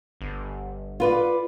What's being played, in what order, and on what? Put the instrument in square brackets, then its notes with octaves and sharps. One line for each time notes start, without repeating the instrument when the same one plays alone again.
[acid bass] G1
[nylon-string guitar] F4 B4 D5